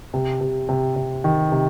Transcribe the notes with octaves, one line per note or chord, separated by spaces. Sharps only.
C3
C3
C3
C3
D#3
C3